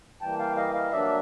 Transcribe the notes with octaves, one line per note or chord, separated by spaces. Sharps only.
E3 G3 A#3 G5 A5
F5 G5
D#5 F5
D#5 F5
F#3 A#3 D4 D5 E5